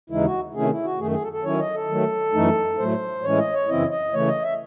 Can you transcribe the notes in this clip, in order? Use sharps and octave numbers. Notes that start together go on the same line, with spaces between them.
D#2 C#3 E3 G#3 D#4 E4
F#4
C3 D#3 A3 C#4 E4 G#4
E4
F#4
F#2 D#3 A3 G#4
G#4
A4
A4
D#3 F#3 C#4 E4 C#5
D#5
A4
D#3 F#3 A3
F#2 E3 A3 D#4
A2 F#3 A3 C5
A2 E3 G#3 C#4 E4 C#5
D#5
C#5
F#2 C#3 E3 C4 E4 D#5
D#5
C#3 E3 A3 C#5
D#5
E5